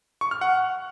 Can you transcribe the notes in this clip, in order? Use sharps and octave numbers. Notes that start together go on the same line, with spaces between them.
C#6
F6
F#5